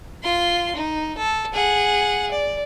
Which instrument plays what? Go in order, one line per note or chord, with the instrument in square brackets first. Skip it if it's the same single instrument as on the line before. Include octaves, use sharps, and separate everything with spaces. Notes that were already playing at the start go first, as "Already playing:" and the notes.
[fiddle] F4 C6
D#4
A4
G#4 F#5
D5